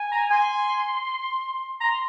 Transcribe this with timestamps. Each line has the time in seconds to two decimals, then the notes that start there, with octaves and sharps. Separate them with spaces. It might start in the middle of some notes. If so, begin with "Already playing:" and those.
Already playing: G#5
0.12 A#5
0.30 G#5 C6
1.81 A#5 C6